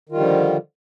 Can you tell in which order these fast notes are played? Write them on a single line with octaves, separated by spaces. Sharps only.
D#3 F4 G3 D3 F3